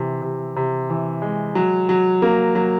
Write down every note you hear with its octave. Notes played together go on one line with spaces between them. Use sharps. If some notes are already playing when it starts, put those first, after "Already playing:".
Already playing: C3 E3
C3
C3
E3
G#3
F#3
F#3
A#3
F#3